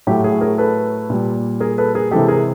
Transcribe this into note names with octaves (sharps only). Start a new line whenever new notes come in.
A2 F#3 A3 G4
G#4
G#4 A#4
A4 B4
A#2 G3
G#4 A#4
A4 B4
G#4 A#4
C3 E3 G#3 G4 A4
G#4 A#4